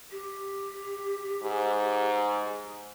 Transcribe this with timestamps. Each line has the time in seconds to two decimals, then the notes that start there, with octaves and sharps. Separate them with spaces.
0.11 G4
1.43 G#2